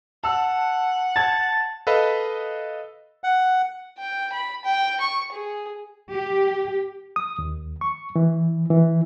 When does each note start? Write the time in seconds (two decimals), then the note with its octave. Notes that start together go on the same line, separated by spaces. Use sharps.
0.24 F#5 A5 E6
1.16 A5 G#6 A6
1.87 A4 B4 D#5 F5 B5
3.24 F#5
3.99 G5
4.32 B5
4.65 G5
5.00 C#6
5.32 G#4
6.12 G4
7.16 D#6
7.39 D#2
7.81 C#6
8.16 E3
8.70 E3